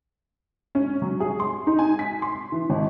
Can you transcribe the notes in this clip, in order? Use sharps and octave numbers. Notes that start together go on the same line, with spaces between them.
C#4
F#3
G#4
C6
D#4
G#5
B6
C6
E3
G#1